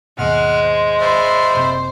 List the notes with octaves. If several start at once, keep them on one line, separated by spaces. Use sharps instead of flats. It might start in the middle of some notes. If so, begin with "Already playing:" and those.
D#2 G#2 B2 G#3 F#5 F6
C5
C5 D5 E5 B5
F#1 C3